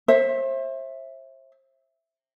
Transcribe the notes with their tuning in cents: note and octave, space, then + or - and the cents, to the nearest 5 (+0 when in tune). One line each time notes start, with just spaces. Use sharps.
C5 +35 E5 +0